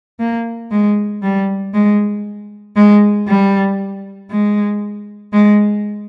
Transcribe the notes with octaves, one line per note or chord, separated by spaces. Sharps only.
A#3
G#3
G3
G#3
G#3
G3
G#3
G#3